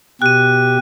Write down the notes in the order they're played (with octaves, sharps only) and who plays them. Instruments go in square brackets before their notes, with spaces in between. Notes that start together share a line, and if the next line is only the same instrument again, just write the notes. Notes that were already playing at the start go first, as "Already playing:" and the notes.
[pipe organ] B2 G4 [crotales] F#6 D#7